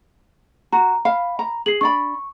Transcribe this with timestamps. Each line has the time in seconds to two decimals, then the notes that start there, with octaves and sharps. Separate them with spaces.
0.73 F#4 A#5
1.05 F5 B5
1.39 A#5
1.66 G#4 C7 F#7
1.81 D4 D5 B5 C#6